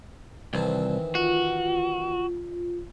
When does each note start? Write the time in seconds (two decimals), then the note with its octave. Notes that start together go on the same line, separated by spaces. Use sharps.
0.53 C2 D#3 E3 C4
1.15 F4 F#4